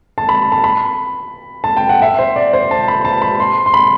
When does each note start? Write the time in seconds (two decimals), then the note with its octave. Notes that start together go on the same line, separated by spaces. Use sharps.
0.18 A5
0.29 B5
0.52 A5
0.64 B5
1.64 A5
1.77 G5
1.89 F#5
2.02 E5
2.19 C5
2.36 D5
2.53 C5
2.71 A5
2.88 B5
3.05 A5
3.22 B5
3.40 C6
3.66 C6
3.74 B5